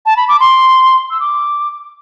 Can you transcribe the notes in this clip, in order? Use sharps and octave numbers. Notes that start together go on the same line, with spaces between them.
A5
B5
D6
C6
E6
D6